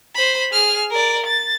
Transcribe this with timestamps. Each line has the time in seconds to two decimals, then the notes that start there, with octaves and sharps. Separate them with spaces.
0.15 C5 B5
0.52 G#4 F6
0.91 A#4 D5
1.26 A6